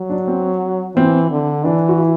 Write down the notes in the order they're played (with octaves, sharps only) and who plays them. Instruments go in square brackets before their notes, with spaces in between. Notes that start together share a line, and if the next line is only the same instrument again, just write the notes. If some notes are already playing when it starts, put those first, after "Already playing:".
Already playing: [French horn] F#3
[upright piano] D4
C4
[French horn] E3 [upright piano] C4
[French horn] D3
[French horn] E3 [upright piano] D4
[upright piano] F#4
E4